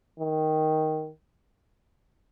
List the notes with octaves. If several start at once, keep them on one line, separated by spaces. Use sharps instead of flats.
D#3